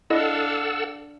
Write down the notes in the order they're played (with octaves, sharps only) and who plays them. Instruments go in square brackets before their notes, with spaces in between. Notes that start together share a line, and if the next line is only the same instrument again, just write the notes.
[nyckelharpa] D4 F5 [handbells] E4 D#5 [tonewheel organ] A4 F#5 E6